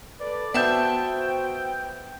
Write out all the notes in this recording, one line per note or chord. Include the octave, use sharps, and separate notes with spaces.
A4 B4 D5
B3 F#4 C5 E5 G5 A5 G6